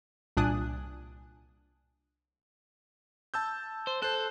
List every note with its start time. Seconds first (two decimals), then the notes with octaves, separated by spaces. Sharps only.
0.37 C2 A#2 D4 G#5 D#6 F#6
3.34 A5 E6 G6
3.87 C5
4.02 A4 C5 F#6